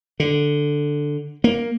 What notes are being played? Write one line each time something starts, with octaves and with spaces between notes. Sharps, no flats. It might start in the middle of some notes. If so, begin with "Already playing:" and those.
D3
A#3